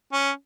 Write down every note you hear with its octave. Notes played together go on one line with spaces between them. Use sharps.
C#4